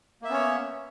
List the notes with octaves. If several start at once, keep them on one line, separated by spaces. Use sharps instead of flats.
A#3 B3 C#4 C#5 E5